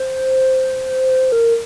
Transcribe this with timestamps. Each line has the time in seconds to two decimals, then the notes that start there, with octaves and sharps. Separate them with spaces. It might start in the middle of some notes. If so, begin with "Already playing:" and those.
Already playing: C5
1.32 A#4